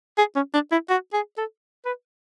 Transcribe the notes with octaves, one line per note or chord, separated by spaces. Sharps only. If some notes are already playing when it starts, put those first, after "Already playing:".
G#4
C#4
D4
E4
F#4
G#4
A4
B4